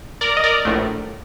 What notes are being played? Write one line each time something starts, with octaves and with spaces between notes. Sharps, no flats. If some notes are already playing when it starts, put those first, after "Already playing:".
A#4 D5
D#5
A#4 D5
A#1 A2 A3